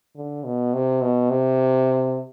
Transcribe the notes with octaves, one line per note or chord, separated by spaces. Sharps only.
D3
B2
C3
B2
C3